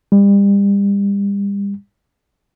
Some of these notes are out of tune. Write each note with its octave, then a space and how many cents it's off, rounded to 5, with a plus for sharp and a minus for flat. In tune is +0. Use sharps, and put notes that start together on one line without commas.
G3 +35